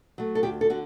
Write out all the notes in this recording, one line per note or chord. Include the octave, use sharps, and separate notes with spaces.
F#3 A3
A4
D2 G4
A4
D3 F#4